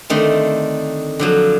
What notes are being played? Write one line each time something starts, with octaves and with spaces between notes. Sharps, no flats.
D3 D#3 A3 C4
D3 F3 F#3